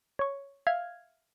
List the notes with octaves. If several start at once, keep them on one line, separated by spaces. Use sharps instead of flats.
C#5 C#6
E5 F5 F6 G#6